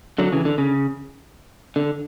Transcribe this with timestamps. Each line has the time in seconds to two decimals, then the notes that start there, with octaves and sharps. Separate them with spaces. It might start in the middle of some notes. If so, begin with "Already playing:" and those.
0.18 D3 F#3
0.32 C#3 E3
0.45 D3
0.58 C#3
1.76 D3